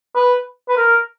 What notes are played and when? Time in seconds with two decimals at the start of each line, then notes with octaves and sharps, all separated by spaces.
0.15 B4
0.69 B4
0.77 A#4